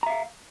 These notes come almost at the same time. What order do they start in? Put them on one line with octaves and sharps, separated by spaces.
A#5 E5 F5